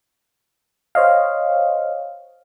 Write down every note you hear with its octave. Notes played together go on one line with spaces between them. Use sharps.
C5 C#5 D#5 F5